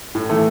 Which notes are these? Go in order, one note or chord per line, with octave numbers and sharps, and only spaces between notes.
A2
E3 A3